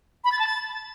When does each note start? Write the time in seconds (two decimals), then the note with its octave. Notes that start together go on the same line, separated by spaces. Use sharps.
0.24 B5
0.32 A6
0.39 A5
0.47 A6